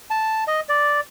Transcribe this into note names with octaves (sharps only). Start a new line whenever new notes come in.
A5
D#5
D5